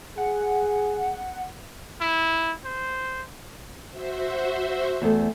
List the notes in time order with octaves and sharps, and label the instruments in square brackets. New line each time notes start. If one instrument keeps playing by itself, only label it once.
[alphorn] G#4 [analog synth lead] F#5
[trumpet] E4
C5
[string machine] F#4 C5 E5
[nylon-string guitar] E2 A3